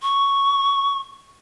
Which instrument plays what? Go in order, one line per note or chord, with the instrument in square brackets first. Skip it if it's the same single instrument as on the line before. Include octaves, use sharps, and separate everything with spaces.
[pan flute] C#6